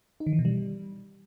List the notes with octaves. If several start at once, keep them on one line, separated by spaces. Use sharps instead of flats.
D#4
D#3
E3
B2
G3